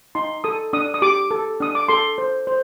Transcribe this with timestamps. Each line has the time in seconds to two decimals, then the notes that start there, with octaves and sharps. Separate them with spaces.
0.15 D#4 C6
0.44 A4 D#6
0.73 D4 D#6
0.94 D#6
1.02 G4 D6
1.31 A4
1.60 D4 D#6
1.75 D6
1.88 A4 C6
2.18 C5
2.47 C5